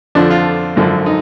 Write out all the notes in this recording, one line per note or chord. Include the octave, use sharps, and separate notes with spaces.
F2 D3 F3 D4
F4
G#1 F#2 D3 F3
D#4